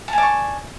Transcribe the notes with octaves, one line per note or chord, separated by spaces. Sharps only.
D5 G#5 A5 C#6